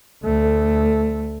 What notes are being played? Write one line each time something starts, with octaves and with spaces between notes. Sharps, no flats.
D2 A3